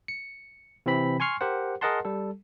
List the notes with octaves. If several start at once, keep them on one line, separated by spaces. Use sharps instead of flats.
C#7
C3 E3 C4 B5 B6
G#5 C6 C#6 F6 C7
G4 A#4 C5 F#5
G#4 A#4 D#5 F#5 A5 C6
G3 A4